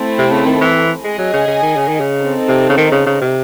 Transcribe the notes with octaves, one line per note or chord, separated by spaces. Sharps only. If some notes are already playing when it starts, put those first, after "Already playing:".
Already playing: A3 C4 E4 A4
C3
C#3
D#3
E3
G#3 G#4 D#5 G#5
F#3
C#3
C#3
D#3
C#3
D#3
C#3
C4 D#4 A4
C3
C#3
D#3
C#3
C#3
C3